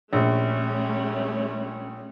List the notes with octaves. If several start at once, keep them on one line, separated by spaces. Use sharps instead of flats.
A#1 G3 A3 C#4